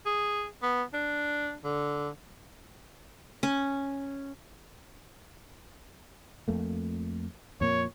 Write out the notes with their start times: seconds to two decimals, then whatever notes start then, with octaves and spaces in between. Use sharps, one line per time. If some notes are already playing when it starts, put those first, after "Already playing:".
0.06 G#4
0.63 B3
0.94 D4
1.64 D3
3.43 C#4
6.48 F2 A3 A#3
7.61 F2 A#2 A#3 C#5